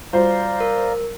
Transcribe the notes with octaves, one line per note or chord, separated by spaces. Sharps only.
G3 F4 F#4 C5 D5 F5 A#5
A#4